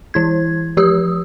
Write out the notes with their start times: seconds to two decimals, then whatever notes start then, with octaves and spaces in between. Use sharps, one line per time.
0.14 E3 E4 G#6
0.77 F3 G4 D#6 E6